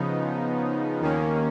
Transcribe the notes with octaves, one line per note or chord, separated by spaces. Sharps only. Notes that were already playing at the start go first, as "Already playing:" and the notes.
Already playing: C#3 F3 B3 D#4
D#2 D#3 A#3 C#4